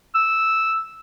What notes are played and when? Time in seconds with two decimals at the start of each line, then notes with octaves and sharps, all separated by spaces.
0.15 E6